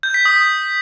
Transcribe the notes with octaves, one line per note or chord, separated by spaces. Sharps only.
G6
B6
D#6